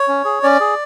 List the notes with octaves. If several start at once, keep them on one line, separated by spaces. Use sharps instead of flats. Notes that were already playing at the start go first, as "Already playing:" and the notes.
Already playing: C#5
C#4
G#4
C#4 D5
G#4